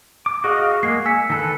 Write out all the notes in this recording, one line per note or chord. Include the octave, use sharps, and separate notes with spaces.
D6
F#4 G#4 D#5 F5 C#6
G#3 A#3 C7
G#5 E6 B6 C#7
D#3 A4 B4